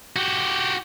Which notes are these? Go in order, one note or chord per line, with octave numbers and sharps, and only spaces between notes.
F#4 G4